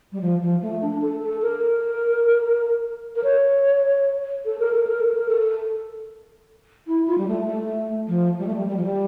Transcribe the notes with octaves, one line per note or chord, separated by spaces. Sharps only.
G3
F3
F3
A3
D4
A4
A4
A#4
A#4
C#5
A4
A#4
A4
A#4
A4
A#4
A4
E4
F4
G3
A3
A3
F3
G3
A3
G3
G3
F3
G3